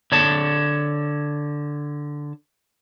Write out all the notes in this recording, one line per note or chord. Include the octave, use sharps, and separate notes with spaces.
D3 C#5 A5